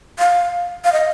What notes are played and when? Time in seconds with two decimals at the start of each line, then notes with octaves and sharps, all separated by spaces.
0.19 F5
0.84 F5
0.93 D#5